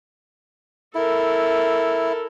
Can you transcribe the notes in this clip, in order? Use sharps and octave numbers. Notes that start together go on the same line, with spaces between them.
E4 A4 A#4